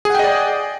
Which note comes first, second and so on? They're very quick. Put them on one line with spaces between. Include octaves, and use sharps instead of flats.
G#4 F#5 G5 D#5 D5